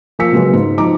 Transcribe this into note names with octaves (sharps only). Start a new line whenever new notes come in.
F3 A#3 F4 E6 B6 C#7
C#3 F#3 G#3 A#3 B3 C#4
G#2
F3 D#4 A#5 D6